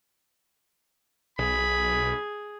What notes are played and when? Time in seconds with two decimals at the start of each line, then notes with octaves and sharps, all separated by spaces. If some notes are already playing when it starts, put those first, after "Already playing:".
1.39 B1 G#4 B5